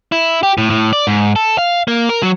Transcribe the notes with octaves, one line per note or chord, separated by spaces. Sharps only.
E4
G4
A2
A2
D5
G#2
A4
F5
A#3
A#4
F#3